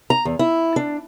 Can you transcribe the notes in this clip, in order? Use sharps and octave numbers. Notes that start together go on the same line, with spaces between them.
A#5
E2
E4
D4